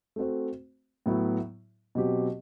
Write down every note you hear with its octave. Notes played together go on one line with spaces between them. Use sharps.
A3 C4 F#4 C5
A2 F#3 B3 E4
B2 F#3 C4 G4